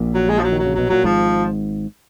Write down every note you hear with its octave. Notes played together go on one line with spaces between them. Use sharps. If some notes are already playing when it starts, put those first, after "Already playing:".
Already playing: A#1 A#2
F#3
G#3
F3
F#3
D#3
F#3
C#3
B2 F#3
A#2 F#3
G#1 G#2 F3